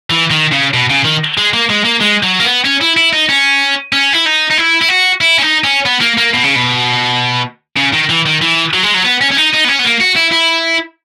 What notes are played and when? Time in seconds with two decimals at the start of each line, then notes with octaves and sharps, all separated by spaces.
0.10 E3
0.31 D#3
0.52 C#3
0.74 B2
0.90 C#3
1.05 D#3
1.38 G#3
1.53 A#3
1.70 G#3
1.85 A#3
2.01 G#3
2.23 F#3
2.40 A#3
2.44 B3
2.65 C#4
2.81 E4
2.97 E4
3.13 D#4
3.29 C#4
3.93 C#4
4.13 E4
4.26 D#4
4.50 D#4
4.58 E4
4.81 E4
4.89 F#4
5.21 E4
5.38 C#4
5.42 D#4
5.64 C#4
5.86 B3
6.01 A#3
6.18 A#3
6.34 B2
6.44 C#3
6.55 B2
7.76 C#3
7.93 D#3
8.09 E3
8.26 D#3
8.41 E3
8.74 F#3
8.83 G#3
8.94 F#3
9.05 B3
9.21 C#4
9.31 C#4
9.37 D#4
9.54 D#4
9.64 B3
9.68 C#4
9.79 B3
9.85 A#3
10.01 F#4
10.16 E4
10.32 E4